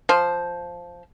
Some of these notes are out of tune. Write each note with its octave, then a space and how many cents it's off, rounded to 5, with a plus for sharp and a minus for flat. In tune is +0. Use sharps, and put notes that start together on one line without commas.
F3 +0 C5 +0